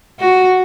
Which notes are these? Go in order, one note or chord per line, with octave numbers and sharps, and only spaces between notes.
F#4